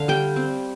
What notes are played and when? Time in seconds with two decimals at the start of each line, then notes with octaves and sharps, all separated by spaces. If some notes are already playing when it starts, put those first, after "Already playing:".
Already playing: D3 F5
0.08 G3 G5
0.36 C4